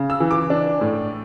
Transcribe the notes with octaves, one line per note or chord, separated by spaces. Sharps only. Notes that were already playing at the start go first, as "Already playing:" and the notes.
Already playing: C#3
E6
E3
D6
D4
A2